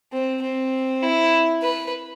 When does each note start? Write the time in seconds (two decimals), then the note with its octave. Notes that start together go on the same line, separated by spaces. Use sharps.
0.12 C4
0.42 C4
1.03 E4
1.62 B4